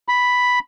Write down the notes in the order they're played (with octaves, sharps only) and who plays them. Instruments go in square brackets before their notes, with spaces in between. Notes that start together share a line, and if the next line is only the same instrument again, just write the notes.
[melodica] B5